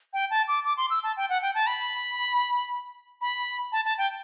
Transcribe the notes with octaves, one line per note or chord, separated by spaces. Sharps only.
G5
A5
D6
D6
C6
E6
A5
G5
F#5
G5
A5
B5
B5
A5
A5
G5